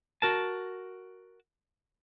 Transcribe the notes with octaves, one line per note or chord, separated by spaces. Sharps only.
F#4 A#4 A5